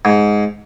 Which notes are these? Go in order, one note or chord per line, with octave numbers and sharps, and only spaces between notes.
G#2